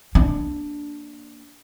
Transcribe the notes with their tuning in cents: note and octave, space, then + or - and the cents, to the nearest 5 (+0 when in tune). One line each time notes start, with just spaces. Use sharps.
A#3 +0 D4 +0